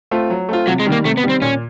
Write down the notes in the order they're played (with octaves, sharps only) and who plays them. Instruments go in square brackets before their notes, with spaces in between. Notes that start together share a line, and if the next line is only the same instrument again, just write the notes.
[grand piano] A3 C4 F4
F#3
A3 C4 F4
[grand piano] C3 [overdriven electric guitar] F#3
[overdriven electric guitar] G#3
[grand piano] D#3 G3
[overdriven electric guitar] A#3
[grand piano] C3 [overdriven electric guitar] A3
[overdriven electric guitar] B3
[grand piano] D#3 G3
[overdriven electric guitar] C4
[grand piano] A#2 [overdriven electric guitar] C#4